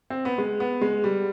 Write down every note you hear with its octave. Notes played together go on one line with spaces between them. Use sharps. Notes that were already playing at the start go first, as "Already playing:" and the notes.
C4
B3
G#3
B3
G#3
G3